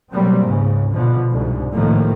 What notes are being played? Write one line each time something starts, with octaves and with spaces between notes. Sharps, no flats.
B2 F#3 G3 A#3 C4
C#2 G#2 C#3
B2 D3 F3
C2 G#2 D3
A2 C3 D#3 F3 A3 A#3